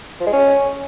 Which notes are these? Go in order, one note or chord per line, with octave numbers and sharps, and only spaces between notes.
F3
G#3
C#4